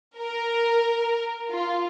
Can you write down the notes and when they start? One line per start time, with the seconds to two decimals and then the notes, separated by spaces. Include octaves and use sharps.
0.18 A#4
1.51 F4